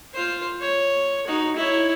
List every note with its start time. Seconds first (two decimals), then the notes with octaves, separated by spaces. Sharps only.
0.14 F4 C5
0.61 C#5
1.27 D#4 F#4
1.56 E4 C#5